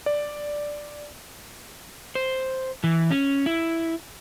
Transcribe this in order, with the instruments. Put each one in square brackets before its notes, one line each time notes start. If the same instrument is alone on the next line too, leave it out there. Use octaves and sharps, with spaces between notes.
[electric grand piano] D5
[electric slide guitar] C5
E3
C#4
E4